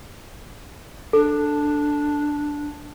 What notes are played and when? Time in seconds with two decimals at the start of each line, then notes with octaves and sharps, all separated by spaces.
1.13 D4 A4